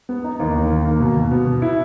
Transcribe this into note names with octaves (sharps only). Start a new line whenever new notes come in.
B3
D#4
D#2
D#3
D#3
A#3
B2
B2
B3
B2
E4